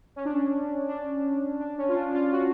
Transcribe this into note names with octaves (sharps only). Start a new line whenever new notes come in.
C#4
D4
C#4
D4
D4
C#4
F4
D4
F4
F#4